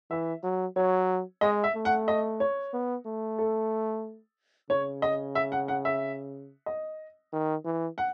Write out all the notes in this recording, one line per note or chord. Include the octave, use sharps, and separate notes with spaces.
E3 E5
F#3
F#3 C#5
G#3 D#5
E5
A3
F#5
D#5
C#5
B3
A3
A4
C#3 C#5
D#5
E5
F#5
F#5
E5
D#5
D#3
E3
F#5